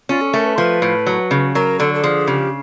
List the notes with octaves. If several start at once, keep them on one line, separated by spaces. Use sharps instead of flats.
C#4 F4
A4
A3 A#4
B4
F3 B4
A2
F#3
C#3
F#3 A#4
D3 A4
A4
F3 G#4
C#3 G4